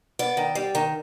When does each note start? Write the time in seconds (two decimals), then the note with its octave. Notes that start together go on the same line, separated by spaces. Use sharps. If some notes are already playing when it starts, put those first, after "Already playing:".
0.19 B3 D5
0.37 D#3
0.55 G3
0.75 D#3